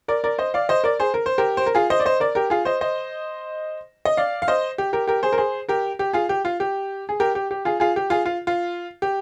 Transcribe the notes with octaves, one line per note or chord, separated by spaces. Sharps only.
A#4 D5
A#4 D5
C5 D#5
D5 F5
C5 D#5
A#4 D5
G#4 C5
A#4
C5
G4 A#4
C5
A#4
F4 G#4
C5 D#5
D5
C5 D#5
A#4 D5
G4 A#4
F4 G#4
C5 D#5
C5 D#5
D#5
D5 F5
F5
C5 D#5
G4
G4 A#4
G4 A#4
G#4 C5
A#4
G#4 C5
G4 A#4
G4
F4 G#4
G4
F4
G4
G#4
G4 A#4
G4
G4
F4 G#4
F4 G#4
G4
F4 G#4
F4
F4
G4